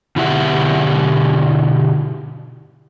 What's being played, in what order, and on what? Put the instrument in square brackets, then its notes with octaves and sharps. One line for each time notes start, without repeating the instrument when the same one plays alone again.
[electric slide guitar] B2 D3 E4 G4 E5 F#5